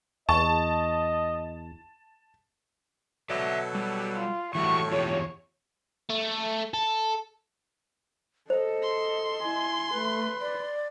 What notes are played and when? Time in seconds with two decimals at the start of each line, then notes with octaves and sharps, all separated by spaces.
0.29 E2 D#5 A5 C#6
3.30 B2 F#3 A4 D5 E5
3.75 G3
4.15 F4
4.55 A2 E3 G3 F#4 C#6
4.91 E2 F4 G4 C#5
6.09 A3
6.74 A4
8.50 A4 C5 D#5
8.83 C6
9.42 E4 G#5
9.93 A3 B4
10.41 D5